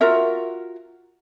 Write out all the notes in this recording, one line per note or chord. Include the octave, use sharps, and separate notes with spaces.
F4 F#4 A#4 E5